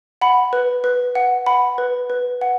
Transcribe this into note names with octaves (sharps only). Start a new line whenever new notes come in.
F#5 B5
B4
B4
F#5
F#5 B5
B4
B4
F#5